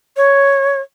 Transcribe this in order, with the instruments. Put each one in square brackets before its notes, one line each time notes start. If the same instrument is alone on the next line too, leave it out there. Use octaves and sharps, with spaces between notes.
[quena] C#5